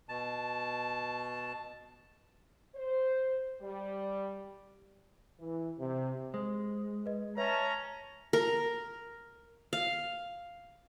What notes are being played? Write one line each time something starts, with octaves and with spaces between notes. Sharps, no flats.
B2 A5
C5
G3
E3
C3
G#3 C5
B4 D#5
C#4 B4 C#5 E5 A5 A#5
A#4
F5